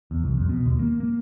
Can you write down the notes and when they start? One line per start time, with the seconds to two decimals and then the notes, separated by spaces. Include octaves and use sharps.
0.11 E2
0.24 C2
0.37 F2
0.49 B2
0.66 D#2
0.79 A#3
1.00 A#3